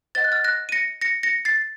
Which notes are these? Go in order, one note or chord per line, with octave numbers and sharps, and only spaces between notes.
C5 D#5 F#5 A6
F#6
F6 A6
F#6 A#6
D#7
A#6 C#7
A#6 C#7
A#6 C#7
A6 C7